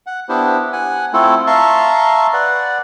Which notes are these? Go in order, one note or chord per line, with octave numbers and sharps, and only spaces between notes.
F#5
B3 D4 E4 G4 C5
F#5 G#5
A3 C4 E4 F4 A4
E5 F5 A5 A#5 C6 C#6
B4 D5 F#5